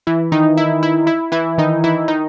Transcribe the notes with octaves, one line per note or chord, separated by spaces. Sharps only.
E3 E4
D#3 D#4
E4
E4
E4
E3 E4
D#3 D#4
E3 E4
D#3 D#4